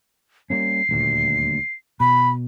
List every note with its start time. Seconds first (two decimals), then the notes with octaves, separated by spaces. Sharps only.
0.50 G3 A#3 C#4 C7
0.89 D#1 D2 A#2
2.00 B2 B5